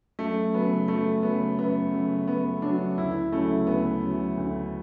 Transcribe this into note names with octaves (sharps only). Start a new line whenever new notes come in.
F#2 A3
C#3 F#3 B3
F#2 A3
C#3 F#3 B3
F#2 B3
C#3 F#3
F#2 B3
C#3 F#3 D4
D2 E4
C#3 F#3 A3
D2 B3
C#3 F#3
D2